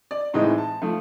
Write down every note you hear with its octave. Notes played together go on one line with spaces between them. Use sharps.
D5
A2 E3 G#3 C4 D#4 D#5
A5
F3 A3